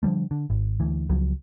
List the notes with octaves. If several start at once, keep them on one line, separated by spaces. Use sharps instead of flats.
D3 F3 G3 A3
D3
G#1
D2 E3
C#2 F3 F#3